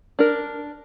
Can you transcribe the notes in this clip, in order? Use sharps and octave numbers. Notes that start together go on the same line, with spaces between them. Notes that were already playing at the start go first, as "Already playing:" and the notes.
D4 A#4